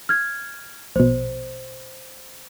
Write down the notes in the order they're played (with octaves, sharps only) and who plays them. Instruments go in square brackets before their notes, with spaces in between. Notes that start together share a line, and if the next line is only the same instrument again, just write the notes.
[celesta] F6 G#6
[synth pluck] A#1 B2 [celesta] C5